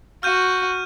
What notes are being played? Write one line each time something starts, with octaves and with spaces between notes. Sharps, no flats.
F#4 F6 G6 D#7